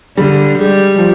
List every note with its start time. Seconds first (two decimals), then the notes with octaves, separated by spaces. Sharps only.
0.17 D3 G3
0.58 G3 G#3
0.98 F3